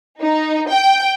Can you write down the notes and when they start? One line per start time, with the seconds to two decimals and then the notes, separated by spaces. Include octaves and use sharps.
0.22 D#4
0.71 G5